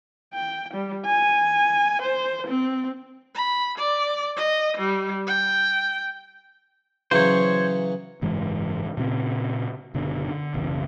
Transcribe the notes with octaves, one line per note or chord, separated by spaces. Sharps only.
G5
G3
G#5
C5
C4
B5
D5
D#5
G3
G5
C#3 E3 F#3 C5 C#5
F#1 G#2 E3 G#3
A#2 C#3 C4
F#1 B2 D3
D3
F#1 B1 C#3 E3